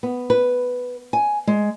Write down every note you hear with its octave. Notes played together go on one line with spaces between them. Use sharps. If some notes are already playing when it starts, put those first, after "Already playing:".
B3
B4
G#5
G#3